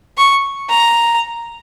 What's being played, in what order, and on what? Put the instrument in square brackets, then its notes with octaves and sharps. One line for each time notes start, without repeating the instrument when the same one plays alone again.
[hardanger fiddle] C#6
A#5